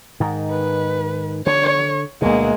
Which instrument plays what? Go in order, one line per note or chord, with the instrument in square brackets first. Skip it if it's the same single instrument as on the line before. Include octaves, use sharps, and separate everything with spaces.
[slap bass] G#2 D#3
[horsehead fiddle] B4
[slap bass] D3 [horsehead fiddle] C#5
[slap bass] D2 B2 [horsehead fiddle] G#3 A#3